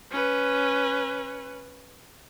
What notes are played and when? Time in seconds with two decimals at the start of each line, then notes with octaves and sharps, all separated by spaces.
0.11 C#4 B4